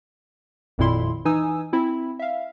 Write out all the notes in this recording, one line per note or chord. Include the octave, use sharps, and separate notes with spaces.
G#1 F2 A#2 E4 C6
E3 D#4 G#5 D#6 E6
C4 E4
E5 F5